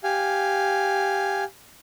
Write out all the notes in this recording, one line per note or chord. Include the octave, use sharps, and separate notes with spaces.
G4 F5 G#5